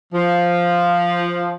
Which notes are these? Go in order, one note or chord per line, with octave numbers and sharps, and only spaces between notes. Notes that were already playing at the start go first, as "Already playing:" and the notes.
F3